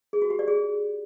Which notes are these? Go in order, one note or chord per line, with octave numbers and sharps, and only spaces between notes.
G#4
F#4
G4
D5
G#4